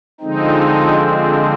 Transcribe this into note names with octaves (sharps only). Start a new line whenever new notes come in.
D3 F3 G#3 C4 D#4